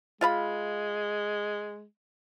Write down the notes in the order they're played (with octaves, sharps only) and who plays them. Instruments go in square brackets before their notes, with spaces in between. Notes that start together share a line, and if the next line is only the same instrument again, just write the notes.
[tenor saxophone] G#3 [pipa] F4 F5 B5